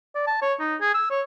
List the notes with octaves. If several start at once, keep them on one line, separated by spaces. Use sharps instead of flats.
D5
A5
C#5
D#4
G#4
E6
C#5